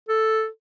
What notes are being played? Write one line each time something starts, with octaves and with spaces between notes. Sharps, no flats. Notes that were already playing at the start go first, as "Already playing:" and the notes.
A4